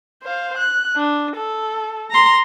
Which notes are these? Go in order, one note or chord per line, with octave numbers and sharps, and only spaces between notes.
C5 F5
F#6
D4
A4
A#5 C6